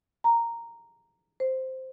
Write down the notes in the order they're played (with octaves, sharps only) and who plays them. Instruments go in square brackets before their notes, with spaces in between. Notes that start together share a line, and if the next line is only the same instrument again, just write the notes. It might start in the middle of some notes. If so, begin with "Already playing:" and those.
[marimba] A#5
C5